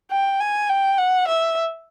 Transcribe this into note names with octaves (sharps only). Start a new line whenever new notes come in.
G5
G#5
G5
F#5
E5